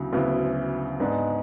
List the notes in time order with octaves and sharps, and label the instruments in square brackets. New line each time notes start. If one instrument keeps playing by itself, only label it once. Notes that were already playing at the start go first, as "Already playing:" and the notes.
Already playing: [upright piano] D2 C#3 F#3 B3 E4
D2 C#3 F#3 B3 E4
G#2 G#3 B3 D4